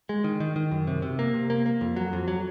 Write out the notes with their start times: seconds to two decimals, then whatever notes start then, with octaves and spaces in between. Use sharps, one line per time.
0.09 G#3
0.24 D#3
0.40 D#3
0.56 D#3
0.72 F#2
0.87 C3
1.02 C3
1.19 A#3
1.34 C3
1.50 A#3
1.66 A#3
1.81 F2
1.96 F#3
2.13 F2
2.28 F#3